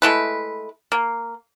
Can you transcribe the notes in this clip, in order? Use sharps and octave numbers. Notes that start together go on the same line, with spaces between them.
G#3 A3 E4 B4
A#3